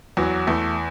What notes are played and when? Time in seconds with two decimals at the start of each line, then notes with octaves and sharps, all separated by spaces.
0.17 E2 F#3
0.47 E2 A3